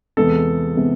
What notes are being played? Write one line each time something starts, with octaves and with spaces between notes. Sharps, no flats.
E2 C3 G#3 B3 A4
C3 G#3 B3